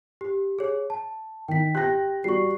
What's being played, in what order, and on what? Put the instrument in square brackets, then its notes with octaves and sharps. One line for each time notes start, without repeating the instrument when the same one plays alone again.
[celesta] G4
G#4 C#5
A5
[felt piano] D#3 [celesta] G5 B6
[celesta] G4 G5 [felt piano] F#6 A#6
[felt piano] G3 F#4 [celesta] C#6 C7